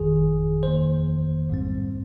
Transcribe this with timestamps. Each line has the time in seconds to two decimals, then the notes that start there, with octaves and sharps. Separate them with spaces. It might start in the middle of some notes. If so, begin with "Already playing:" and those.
Already playing: G1 F2 D#3 G#4
0.63 F2 D#3 A#3 C5
1.49 A#1 G#2 G3 C4